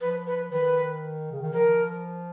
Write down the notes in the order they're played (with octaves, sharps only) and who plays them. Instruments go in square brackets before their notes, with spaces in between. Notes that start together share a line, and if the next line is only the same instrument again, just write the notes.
[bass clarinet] F3 [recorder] B4
[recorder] B4
[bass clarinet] D#3 [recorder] B4
[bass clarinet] C#3
D#3
[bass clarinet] F3 [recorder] A#4